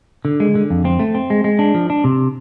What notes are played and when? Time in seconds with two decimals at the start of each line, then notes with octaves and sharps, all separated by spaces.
0.25 D3
0.40 G#3
0.55 D3
0.70 F2
0.85 C4
1.00 A3
1.15 C4
1.30 G#3
1.44 G#3
1.59 D4
1.74 F3
1.90 D4
2.04 C3